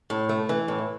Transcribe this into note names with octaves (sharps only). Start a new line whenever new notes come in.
A2
A3
E3
A2